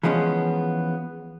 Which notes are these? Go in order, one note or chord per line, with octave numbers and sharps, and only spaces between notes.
E3 F3 G#3 B3 C#4